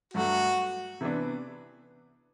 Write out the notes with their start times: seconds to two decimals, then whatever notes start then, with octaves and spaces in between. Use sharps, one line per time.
0.14 G2 F#3 A3 F#4
1.01 C3 E3 B3 D4